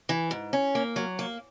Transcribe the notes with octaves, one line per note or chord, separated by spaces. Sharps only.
E3
G#2
C#4
A#3
F#3
A#3